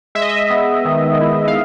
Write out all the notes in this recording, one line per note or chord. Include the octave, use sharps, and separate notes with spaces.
G#3 E5
D#5
E5
B3
D#3
E4
F5